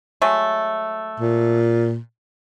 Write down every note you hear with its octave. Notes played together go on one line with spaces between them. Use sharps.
F#3 G#3 A3
A#2